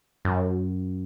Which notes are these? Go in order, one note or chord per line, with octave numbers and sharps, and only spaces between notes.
F#2